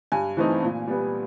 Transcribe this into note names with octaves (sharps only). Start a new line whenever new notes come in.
G2 G#5
E3 A3 C4 D#4
A#2
G3 B3